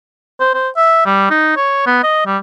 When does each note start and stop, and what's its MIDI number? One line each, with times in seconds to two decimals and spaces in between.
0.40 0.54 72
0.54 0.69 72
0.77 1.02 76
1.06 1.30 55
1.31 1.52 63
1.57 1.84 73
1.86 1.99 59
2.04 2.24 75
2.26 2.38 55